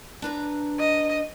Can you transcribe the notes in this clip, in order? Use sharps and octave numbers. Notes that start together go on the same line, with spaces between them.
D4 B4 A#5
D#5